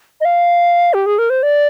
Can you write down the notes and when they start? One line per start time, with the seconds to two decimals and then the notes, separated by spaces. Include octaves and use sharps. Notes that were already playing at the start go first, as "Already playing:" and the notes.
0.21 D#5
0.25 F5
0.94 G4
1.06 G#4
1.19 A#4
1.30 C5
1.43 D5